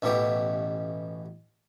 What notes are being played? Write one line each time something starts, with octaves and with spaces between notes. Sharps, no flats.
A1 B2 E3 G4